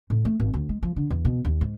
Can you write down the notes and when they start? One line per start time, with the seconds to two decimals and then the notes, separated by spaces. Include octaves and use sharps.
0.10 A2
0.25 A3
0.40 G#1
0.54 D2
0.69 G#3
0.83 F3
0.96 D3
1.10 E2
1.25 B2
1.45 D#2
1.61 G#2